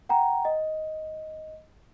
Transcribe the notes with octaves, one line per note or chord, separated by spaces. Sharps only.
F#5 G5 A#5
D#5